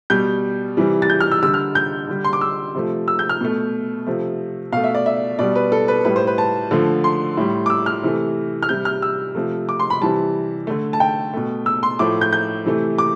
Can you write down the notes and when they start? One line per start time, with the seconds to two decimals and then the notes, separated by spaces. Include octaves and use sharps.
0.10 B2 G3 G6
0.77 C3 E3 G3
1.02 A6
1.10 G6
1.20 F6
1.32 E6
1.42 D3 G3 E6
1.54 F6
1.75 G6
2.08 D3 G3
2.24 C6
2.33 D6
2.41 E6
2.75 C3 F3 A3
3.08 E6
3.19 G6
3.29 F6
3.41 B2 A3
4.07 C3 F3 A3
4.72 B2 A3 F5
4.84 E5
4.95 D5
5.06 E5
5.39 B2 G3 D5
5.55 B4
5.72 A4
5.88 B4
6.05 A2 G3 B4
6.16 C5
6.27 B4
6.38 A5
6.71 D3 F3 A3
7.04 C6
7.37 A2 G3
7.66 D6
7.70 E6
7.86 F6
8.03 C3 E3 A3
8.63 F6
8.69 C3 G3 G6
8.85 F6
9.02 E6
9.35 C3 F3 A3
9.69 D6
9.80 C6
9.90 B5
10.02 C3 E3 G3 A5
10.67 D3 A3
10.93 A5
11.00 G5
11.34 B2 A3
11.66 E6
11.83 C6
11.99 A2 F3 A3 D6
12.21 G6
12.33 G6
12.66 C3 E3 A3
12.98 D6